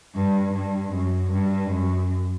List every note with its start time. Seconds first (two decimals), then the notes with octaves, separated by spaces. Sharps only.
0.15 G2
0.54 G2
0.93 F#2
1.32 G2
1.71 F#2